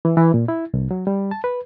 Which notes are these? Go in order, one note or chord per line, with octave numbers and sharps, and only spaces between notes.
E3
E3
A#2
E4
C2
F#3
G3
A5
B4